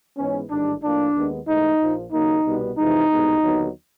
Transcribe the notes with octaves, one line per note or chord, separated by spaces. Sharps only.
G#2 E3 G#3 B3 C#4
A1 G#2 D#3 G3 D4
A2 F3 A#3 D4
D#2 D#3 G#3 B3
G#2 E3 A3 D#4
A#1 A#2 F3
D#2 C#3 F#3 A#3 D#4
C2 B2 G3 B3
F2 C3 E3 G#3 D#4
C2 B2 G#3 B3
D#2 D3 F#3 B3